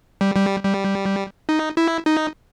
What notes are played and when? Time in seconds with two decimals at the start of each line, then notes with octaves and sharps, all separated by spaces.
0.21 G3
0.36 G3
0.63 G3
1.49 D#4
1.77 E4
2.06 D#4